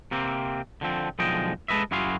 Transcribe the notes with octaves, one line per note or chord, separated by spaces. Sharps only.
C3 A#3 C4
D3 F3 C4
B1 D3 F3 G#3 D#5 G5
G#3 A4 B4 D#5 E5
F#2 E4 F#4 G#4 F5 C6